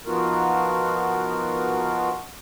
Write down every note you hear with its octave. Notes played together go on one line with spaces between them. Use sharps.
F3 B3 D#4 F4 F#4 A#4